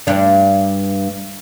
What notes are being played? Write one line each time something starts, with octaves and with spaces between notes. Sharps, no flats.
G2 D4